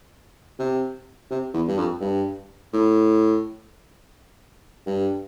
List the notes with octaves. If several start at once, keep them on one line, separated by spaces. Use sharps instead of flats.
C3
C3
E2
G2
F2
G2
A2
G2